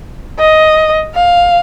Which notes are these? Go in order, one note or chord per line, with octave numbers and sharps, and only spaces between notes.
D#5
F5